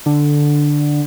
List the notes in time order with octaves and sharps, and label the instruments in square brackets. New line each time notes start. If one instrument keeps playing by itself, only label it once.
[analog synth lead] D3